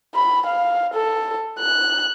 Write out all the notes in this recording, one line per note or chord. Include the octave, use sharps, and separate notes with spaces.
B5
F5
A4
F#6